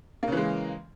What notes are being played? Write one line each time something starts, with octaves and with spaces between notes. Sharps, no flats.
C#3 E3 G#3 A#3